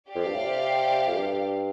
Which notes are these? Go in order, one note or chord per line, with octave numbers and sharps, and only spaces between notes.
F2 G4 D5 F5
G2
A2
C3
F2
G2